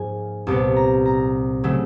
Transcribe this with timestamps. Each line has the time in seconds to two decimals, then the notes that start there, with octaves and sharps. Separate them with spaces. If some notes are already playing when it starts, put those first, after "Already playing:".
Already playing: G#2 F3 A#3 G#5
0.47 C2 A#2 G3 B3 A5
0.76 A#5
1.05 A#5
1.64 C#3 F#3 A3